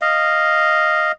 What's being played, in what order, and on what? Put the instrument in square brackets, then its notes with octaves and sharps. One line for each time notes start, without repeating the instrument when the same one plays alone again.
[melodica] D#5 F5